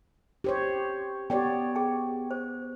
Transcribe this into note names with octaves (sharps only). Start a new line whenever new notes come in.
G4 C5 C#5
B3 G4 C#5 D5 G5
G#4 G5
C5